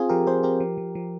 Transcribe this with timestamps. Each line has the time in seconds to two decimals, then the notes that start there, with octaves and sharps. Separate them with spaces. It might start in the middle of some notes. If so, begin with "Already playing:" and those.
Already playing: C4 F4 G#4
0.09 F3 G4 A#4
0.27 C4 G#4 C5
0.43 C4 G4 A#4
0.60 F3
0.78 F3
0.95 F3